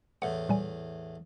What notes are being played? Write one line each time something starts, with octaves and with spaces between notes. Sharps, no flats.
E2 A2 F#5
A#2 G3 G#5